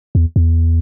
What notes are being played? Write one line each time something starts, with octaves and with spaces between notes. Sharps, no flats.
E2
E2